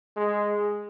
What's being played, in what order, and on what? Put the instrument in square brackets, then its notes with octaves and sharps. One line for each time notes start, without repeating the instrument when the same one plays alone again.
[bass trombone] G#3